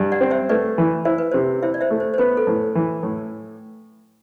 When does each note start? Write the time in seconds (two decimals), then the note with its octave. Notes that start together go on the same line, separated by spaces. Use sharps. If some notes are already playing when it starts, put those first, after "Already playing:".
Already playing: G2
0.12 D5 F#5
0.21 C4
0.31 C5 E5
0.49 A3 B4 D5
0.78 E3
1.05 E4 C5
1.18 B4
1.31 C3 C5
1.62 E4 C5 E5
1.74 D5
1.81 C5 E5
1.90 A3
2.00 C5
2.14 C5
2.18 B3 B4
2.37 A4
2.47 A2
2.75 E3
3.03 A2